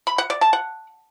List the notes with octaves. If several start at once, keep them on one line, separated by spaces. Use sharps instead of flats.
B5
F#5
D5
A5
F#5